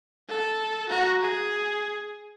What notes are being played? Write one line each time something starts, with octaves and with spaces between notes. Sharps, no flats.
A4
F#4 A#5
G#4